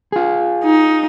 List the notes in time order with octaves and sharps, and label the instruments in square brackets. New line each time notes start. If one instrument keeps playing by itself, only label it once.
[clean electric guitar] F4 G#4
[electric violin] D#4